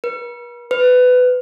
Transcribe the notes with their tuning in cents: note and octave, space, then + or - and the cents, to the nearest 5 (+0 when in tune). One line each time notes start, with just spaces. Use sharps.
B4 -45
B4 +20